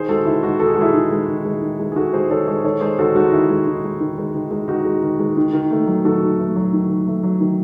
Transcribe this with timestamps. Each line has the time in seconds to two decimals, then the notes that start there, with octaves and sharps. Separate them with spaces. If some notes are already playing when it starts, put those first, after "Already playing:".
Already playing: D#3 G#4 C5
0.09 G#3 F#4 A4
0.25 D#3 E4 G#4
0.43 G#3 D#4 F#4
0.60 D#3 A4
0.67 G#4
0.74 F#4
0.78 G#3 E4 G#4
0.94 D#3
1.11 G#3
1.29 D#3
1.45 G#3
1.62 D#3
1.80 G#3
1.92 G#4
1.96 D#3 F#4 A4
2.13 G#3 G#4 C5
2.30 D#3 A4 C#5
2.47 G#3 G#4 C5
2.64 D#3 A4 C#5
2.81 G#3 G#4 C5
2.99 D#3 F#4 A4
3.15 G#3 D#4 F#4
3.32 D#3 E4
3.50 G#3
3.67 D#3
3.84 G#3
4.00 D#3
4.18 G#3
4.35 D#3
4.51 G#3
4.68 D#3 D#4 F#4
4.85 G#3
5.02 D#3
5.19 G#3
5.37 D#3
5.53 D#3
5.71 A3
5.87 F#3
6.05 D#3 F#4 A4
6.22 D#3
6.39 A3
6.56 F#3
6.73 D#3
6.90 D#3
7.07 A3
7.23 F#3
7.41 D#3